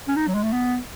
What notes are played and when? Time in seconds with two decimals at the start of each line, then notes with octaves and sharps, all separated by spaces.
0.08 C#4
0.16 D#4
0.27 F#3
0.35 G#3
0.43 A3
0.53 B3